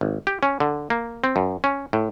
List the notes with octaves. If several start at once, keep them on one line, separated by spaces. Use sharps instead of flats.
G#1
G4
C#4
D3
A#3
C4
F#2
C#4
A2